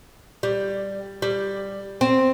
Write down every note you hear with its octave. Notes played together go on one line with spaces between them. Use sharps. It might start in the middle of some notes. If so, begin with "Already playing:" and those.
G3
G3
C4